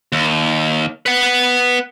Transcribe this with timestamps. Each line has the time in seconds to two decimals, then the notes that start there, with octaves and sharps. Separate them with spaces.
0.12 D#2
1.06 B4 F#5